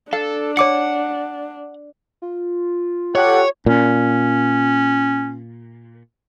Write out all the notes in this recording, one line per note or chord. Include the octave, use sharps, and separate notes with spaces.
D4 A4 F5
C#5 F#5 D6 C#7
F4
G4 A4 C#5 F#5
A#2 C#4